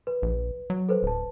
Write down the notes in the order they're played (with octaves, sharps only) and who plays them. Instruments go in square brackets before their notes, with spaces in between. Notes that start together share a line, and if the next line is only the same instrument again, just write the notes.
[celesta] B4
[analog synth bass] A#1
F#3
[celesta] A4 B4 C5
[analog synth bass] D1 [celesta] B4 A5